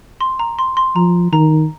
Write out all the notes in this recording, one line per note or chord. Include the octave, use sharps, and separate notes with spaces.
C6
A#5
C6
C6
F3 A#5
D#3 A#5